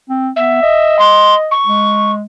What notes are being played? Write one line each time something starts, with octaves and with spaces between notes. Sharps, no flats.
C4
B3 E5
D#5
C6
C#6
G#3